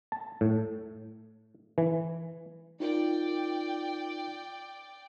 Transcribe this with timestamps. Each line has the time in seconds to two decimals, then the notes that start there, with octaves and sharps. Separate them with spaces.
0.12 A5
0.41 A2
1.78 E3
2.80 D#4 F4 A#4 D5 G5